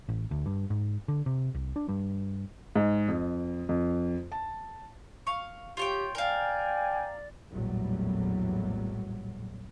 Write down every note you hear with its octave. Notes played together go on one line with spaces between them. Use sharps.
A1
D2
G2
G#2
D3
C3
C2
D4
G2
G#2
F2
F2
A5
F5 C#6
F4 G4 C#5 G5
A#4 D5 F5 G5 G#5
A#1 E2 A2 F#3 G3